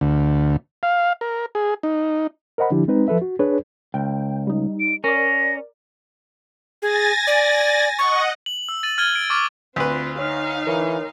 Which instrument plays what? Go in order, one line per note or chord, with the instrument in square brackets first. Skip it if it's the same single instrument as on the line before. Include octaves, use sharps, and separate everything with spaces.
[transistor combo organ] D2
F5
A#4
G#4
D#4
[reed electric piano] A#4 C5 D#5 F#5 B5
D3 F3 D4 E4 G4
G#3 C4 D#4 B4
F3 A4 B4 E5
F#4
D4 G#4 B4 C#5
[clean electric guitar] C#2 [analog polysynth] G5
[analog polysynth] G3 D#4
[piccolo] D7
[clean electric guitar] C#4 [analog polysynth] A#4 D5 [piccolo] A#6
[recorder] G#4 [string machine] G#5 A6 A#6
[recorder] D5
[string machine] D#5 F#5 [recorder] C#6
[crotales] F#7
E6
A6 D#7 F#7
F6 G#6 D#7 G7
D7
C#6 D6 F6 A6
[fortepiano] D2 B4 [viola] C4 F4
[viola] D#4 F5 [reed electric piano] C#5 F6
[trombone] E3 [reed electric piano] A#4 C#5